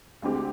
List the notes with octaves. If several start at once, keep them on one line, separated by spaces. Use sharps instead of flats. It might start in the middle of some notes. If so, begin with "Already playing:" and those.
D2 D3 G#3 C4 G4